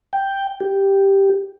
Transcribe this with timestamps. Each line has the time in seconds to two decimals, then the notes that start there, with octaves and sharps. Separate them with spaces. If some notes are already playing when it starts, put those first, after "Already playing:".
0.13 G5
0.60 G4